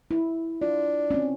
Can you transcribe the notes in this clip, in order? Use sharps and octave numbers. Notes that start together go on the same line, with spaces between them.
E4
D4 F4
C4 C#4